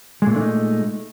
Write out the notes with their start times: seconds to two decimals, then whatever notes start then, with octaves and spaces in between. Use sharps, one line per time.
0.22 G#3
0.27 A#2
0.31 A3
0.36 D4
0.40 D#4